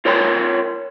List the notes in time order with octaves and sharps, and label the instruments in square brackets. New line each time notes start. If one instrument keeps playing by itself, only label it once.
[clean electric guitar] F4 A#4 C#5 G5 A#5 C6